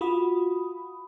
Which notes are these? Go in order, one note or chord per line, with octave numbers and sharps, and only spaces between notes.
F4 F#4 B5 D#6